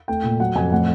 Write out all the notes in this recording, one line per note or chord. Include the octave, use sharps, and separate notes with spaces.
A3 G5
A#2
F#3 F#5
F2 G#5
A2 F#5